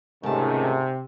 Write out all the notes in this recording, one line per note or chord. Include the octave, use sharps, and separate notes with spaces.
C#2 G#2 C3 D#3 A3 A5